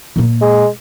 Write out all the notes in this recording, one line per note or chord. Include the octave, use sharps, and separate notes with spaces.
A#2 A#3
G#3